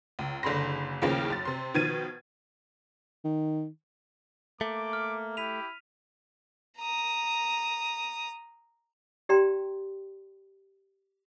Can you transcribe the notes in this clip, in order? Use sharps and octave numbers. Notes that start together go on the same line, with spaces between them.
C#2
F#1 D3 G#4 B5 C6 A#6
D#2 A2 C#3 F3 A#3 C#4
F#2 A6
C3 C6
B2 D#3 F3 G#6 A6 D#7
D#3
A3 A#3 D6
F6
E4 G4 B6 D#7 F7
A#5 D#6
G4 D5 G5 A#5 C6